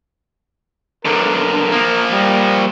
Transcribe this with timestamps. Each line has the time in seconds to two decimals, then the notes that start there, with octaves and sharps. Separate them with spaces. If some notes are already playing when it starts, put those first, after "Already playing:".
1.05 B1 D3 A#4
1.72 F3 A#3
2.12 G3